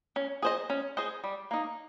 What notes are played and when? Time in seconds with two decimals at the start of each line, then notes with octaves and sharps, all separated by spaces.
0.16 C#4
0.42 G#4 C5 D#5
0.70 C#4
0.97 G#4 C5 D#5
1.24 G3
1.51 A#3 D#4